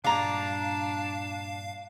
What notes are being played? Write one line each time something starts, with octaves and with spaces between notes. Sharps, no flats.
G2 A#2 D4 D5 F5 A#5